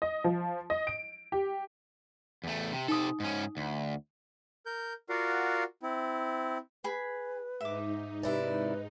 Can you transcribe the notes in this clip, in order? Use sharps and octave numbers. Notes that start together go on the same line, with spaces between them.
D#5
F3
D#5
D7
G4
E2 A3
C3
C3 D#4 A4 D#6
G#2 C#4
D2
A#4 G6
F4 F#4 A#4 D5 F5 F#5
C4 E4
G#4 B4 B5
G#2 D#4 E5 D6
C3 E4 B4 D5